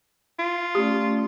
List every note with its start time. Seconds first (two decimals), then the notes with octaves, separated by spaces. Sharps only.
0.39 F4
0.75 A3 C#4 G4 D5